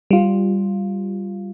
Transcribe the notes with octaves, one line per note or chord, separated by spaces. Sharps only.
G3 F4